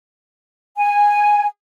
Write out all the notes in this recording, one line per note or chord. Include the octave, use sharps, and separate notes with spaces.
G#5